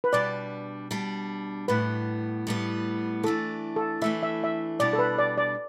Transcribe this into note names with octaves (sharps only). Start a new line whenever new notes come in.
B4
B2 G3 D4 D5
B2 G3 D4
A2 G3 B3 B4
A2 G3 B3
E3 A3 D4 A4
A4
E3 A3 D4 E5
E5
E5
B2 G3 D4 D5
A4
B4
D5
D5